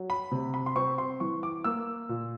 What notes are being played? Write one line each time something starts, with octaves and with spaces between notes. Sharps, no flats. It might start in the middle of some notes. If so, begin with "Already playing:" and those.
Already playing: F#3
B5
C3
B5
C6
C4 C#6
C6
E3 C#6
D6
A#3 E6
A#2